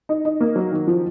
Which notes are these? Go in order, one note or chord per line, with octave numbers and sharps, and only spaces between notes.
D#4
D#4
A#3
F#3
D#3
F3